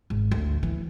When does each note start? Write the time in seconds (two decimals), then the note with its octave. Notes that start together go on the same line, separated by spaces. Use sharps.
0.10 G#1
0.31 D2
0.63 E3